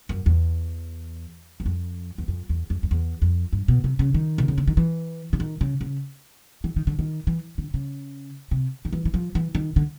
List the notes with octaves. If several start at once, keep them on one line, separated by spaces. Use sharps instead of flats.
F#2
E2
E2
F2
E2
F2
E2
F2
F2
E2
F2
G2
B2
C3
C#3
D#3
C3
C#3
D3
D#3
E3
D3
D#3
C#3
C#3
E3
D#3
D3
D#3
E3
D3
C#3
C3
D#3
E3
E3
F3
E3
D#3
D3